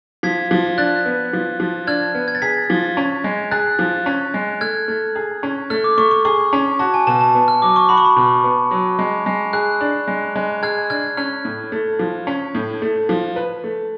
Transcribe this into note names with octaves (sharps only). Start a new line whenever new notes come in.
F3 G#6 B6
F3
D4 F#6 A6
B3
F3
F3
D4 F6 G#6
B3
G#6
A6
G#4 G#6 B6
F3
C#4
G#3
G#4 F#6 A6
F3
C#4
G#3
A3 F6 G#6
A3
G#4
C#4
A3 F6
D6
A3 C#6
C#6
G#4 C#6
C#4
F#4 A5
G#5
B2 A5
A5
B3
F6
F#3 D6
C#6
F#4 B5
C#6
B5
B2
B3
F#3
G#3
G#3
G#4 F#6
D4
G#3
G#3
G#4 F6 G#6
D4 F6 G#6
C#4 F6
A2
A3
F3
C#4
A2
A3
F3
B4
A3